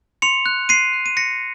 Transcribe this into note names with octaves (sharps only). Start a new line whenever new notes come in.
C6 C#7 F7
F#6
C6 C7 D#7
F#6
D#7
C6 A#6 C#7